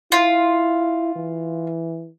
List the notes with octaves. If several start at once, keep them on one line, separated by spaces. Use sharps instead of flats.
E4 F4
E3